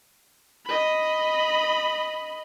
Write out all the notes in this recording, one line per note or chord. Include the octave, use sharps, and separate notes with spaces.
D#5 B5